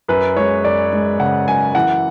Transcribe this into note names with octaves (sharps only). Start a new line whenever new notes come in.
F#2 B4
G#3 C#5
F#2 D5
G#3
C#3 F#5
F#2 G#5
E3 F#5